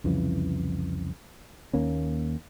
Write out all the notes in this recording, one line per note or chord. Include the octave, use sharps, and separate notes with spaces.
C2 F2 C#3 E3
D#2 A#3 C#4